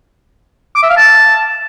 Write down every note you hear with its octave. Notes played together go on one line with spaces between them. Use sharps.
D6
E5
F5
A5